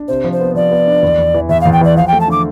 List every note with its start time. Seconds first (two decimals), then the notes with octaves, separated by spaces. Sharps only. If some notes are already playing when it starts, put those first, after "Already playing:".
Already playing: D4
0.08 C3 C5
0.24 F3
0.33 C5
0.40 B3
0.55 F3 D5
0.71 B3
0.87 D4
1.03 E2
1.18 E2
1.34 E3
1.49 E2 E5
1.61 E2 F5
1.73 G5
1.81 E3 D5
1.96 F3 F5
2.08 A3 G5
2.21 A5
2.28 D3 D6